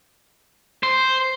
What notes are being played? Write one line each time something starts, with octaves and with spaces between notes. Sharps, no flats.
C5